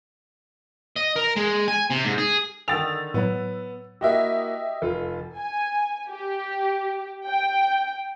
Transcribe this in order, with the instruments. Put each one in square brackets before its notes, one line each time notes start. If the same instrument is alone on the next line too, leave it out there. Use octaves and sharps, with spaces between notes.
[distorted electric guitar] D#5
A#4
G#3
G#5
C3
G#2
G#4
[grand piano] D3 D#3 [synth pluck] G5 D#6 [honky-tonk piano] E6 A6 F7
[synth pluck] A2 F#3 [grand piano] B3
[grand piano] A#3 E4 F#4 [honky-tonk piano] G4 D#5 E5
[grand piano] F1 F4 [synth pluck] A4
[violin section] G#5
G4
G5